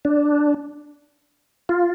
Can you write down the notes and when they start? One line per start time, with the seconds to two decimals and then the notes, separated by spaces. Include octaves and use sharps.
0.05 D4
1.69 F4